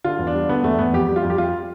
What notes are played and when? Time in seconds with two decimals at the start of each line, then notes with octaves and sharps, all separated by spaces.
0.04 D3 F4
0.19 E2
0.27 D4
0.34 G3
0.49 D3 B3
0.64 E2 A3
0.78 E2 B3
0.93 F2 G4
1.08 G3
1.16 F4
1.23 F2
1.30 G4
1.38 F2 F4